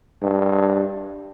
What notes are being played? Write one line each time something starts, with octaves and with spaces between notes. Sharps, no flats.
G2